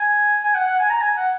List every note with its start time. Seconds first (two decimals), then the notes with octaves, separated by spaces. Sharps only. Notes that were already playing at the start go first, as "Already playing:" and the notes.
Already playing: G#5
0.44 G#5
0.55 F#5
0.66 F#5
0.79 G#5
0.90 A#5
1.01 G#5
1.17 F#5